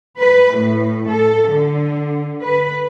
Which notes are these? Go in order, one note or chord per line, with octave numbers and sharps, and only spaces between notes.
B4
A2
A4
D3
B4